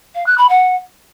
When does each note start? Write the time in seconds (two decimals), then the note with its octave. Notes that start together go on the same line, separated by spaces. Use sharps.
0.15 F5
0.27 F#6
0.38 B5
0.49 F#5